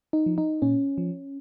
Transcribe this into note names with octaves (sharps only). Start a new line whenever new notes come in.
D#4
F3
D#4
A#2 C#4
F3